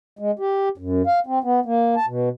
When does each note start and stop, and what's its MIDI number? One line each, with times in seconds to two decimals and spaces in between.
0.19 0.31 56
0.39 0.69 67
0.78 1.02 42
1.07 1.19 77
1.26 1.39 60
1.44 1.60 59
1.65 1.95 58
1.96 2.06 81
2.07 2.29 47